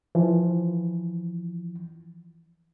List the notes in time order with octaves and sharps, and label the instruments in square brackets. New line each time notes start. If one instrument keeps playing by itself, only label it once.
[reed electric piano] E3 F3